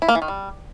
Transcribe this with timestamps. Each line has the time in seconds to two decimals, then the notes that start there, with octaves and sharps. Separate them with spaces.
0.02 E4
0.08 A#3
0.15 E3
0.22 D#3
0.28 G3